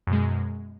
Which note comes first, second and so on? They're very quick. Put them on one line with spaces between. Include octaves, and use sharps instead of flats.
F#2 B2 G#3